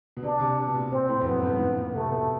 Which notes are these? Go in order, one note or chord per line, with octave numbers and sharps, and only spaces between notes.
B2
C3 D4
C3
B2
A#2
A#2 C4
A2
F2
F#2 B3
G2
G#2
A2
A#2
C3 A3
B2